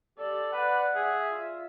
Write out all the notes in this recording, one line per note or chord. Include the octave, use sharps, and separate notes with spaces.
G4 A4 D5
B4 F#5
G#4 E5
F4